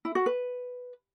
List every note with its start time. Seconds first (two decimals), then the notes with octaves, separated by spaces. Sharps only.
0.05 E4
0.15 F#4
0.26 B4